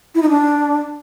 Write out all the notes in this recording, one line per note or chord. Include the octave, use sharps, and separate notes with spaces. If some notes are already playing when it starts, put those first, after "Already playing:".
E4
D#4
D4